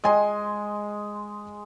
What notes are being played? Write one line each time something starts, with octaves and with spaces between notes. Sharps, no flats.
G#3 D#5 G#5 C6